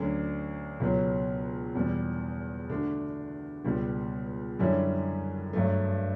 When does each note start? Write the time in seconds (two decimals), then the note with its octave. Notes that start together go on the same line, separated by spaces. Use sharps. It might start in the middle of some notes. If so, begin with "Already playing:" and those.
Already playing: D2 D3 F#3 C#4
0.80 C#2 B2 F#3
1.75 E2 B2 G3
2.70 D3 A3 D4 F#4
3.64 C#2 B2 G3
4.59 F#2 D3 G3 C#4 E4
5.53 G2 F#3 A3